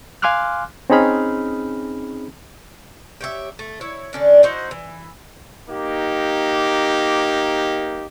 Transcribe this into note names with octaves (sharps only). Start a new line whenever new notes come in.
F5 G#5 C6 D6 F6 F#6
C4 C#4 D#4 G#4 B5 F6
G4 C#5 E5
A3
E4 C#5
D3 C#4 D4
D#4 E4 F#4 C5
E3
A#3 D#4 G4